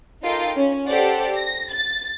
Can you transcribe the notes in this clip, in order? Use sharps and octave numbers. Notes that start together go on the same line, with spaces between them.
D#4 F4 A4 A#4 G5
C#4
G4 A4 C5 D5 F#5
A#6
A6